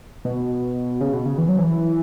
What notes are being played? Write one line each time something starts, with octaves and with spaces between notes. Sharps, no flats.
B2
C#3
B2
C#3
E3
F#3
E3